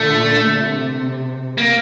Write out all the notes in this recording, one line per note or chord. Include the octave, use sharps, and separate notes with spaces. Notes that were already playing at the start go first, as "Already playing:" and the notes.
Already playing: A#2 D3 A3
C3
A#3